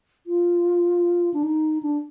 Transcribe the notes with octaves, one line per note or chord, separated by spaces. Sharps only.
F4
D4
D#4
D4